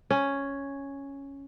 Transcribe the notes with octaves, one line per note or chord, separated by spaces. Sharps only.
C#4